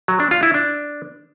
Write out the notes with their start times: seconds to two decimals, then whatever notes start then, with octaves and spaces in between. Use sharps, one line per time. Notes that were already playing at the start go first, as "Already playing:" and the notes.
0.08 F#3
0.20 D4
0.31 F4
0.43 E4
0.54 D4